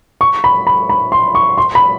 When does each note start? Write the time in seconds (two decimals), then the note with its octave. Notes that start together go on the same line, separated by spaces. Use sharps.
0.21 C#6
0.44 B5
0.67 B5
0.89 B5
1.12 C6
1.35 C#6
1.58 C6
1.75 B5